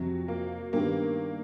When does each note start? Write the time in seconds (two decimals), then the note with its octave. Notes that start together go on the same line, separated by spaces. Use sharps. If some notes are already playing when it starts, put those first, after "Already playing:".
Already playing: F2 C3 F3 F#3
0.28 A#3
0.73 G2 D#3 G3 A#3 B3